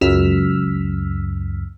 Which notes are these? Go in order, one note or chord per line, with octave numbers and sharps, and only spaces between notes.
C#2 F#2 E6 F6 B6